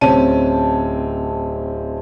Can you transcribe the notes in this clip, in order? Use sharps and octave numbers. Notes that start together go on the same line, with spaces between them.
D1 C4 C#4 A5 D#7